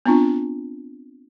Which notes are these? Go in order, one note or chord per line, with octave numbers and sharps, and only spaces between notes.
B3 C4 D4 F4